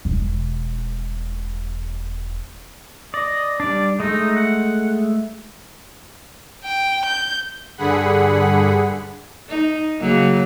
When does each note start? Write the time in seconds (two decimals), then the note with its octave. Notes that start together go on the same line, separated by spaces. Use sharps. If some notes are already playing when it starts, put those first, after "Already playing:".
0.05 E1 B2
3.14 D5 D#5
3.60 G3 D4 D5
4.00 G#3 A3 D#4
4.36 F#5
6.65 G5
7.06 G6
7.77 G2 D3 G#4 F#5 B5
9.49 D#4
10.00 C#3 F#3 A#3